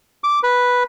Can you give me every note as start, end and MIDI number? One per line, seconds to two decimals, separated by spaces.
0.24 0.39 86
0.43 0.83 71